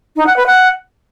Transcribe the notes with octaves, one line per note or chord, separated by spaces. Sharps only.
D#4
F#5
B4
F#5